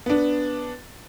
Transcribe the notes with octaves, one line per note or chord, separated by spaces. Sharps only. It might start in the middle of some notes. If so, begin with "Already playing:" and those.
B3 D4